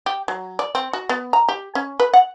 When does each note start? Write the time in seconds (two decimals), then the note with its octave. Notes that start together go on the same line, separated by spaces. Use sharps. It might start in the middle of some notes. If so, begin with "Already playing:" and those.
0.06 G4
0.28 F#3
0.59 D5
0.75 C4
0.93 F#4
1.09 B3
1.33 A#5
1.48 G4
1.75 C#4
1.99 B4
2.13 F#5